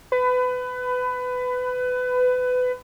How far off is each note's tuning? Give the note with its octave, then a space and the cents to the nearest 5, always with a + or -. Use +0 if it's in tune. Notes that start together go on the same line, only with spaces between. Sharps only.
B4 +25